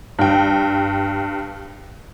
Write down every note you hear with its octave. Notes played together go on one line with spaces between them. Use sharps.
G2 G5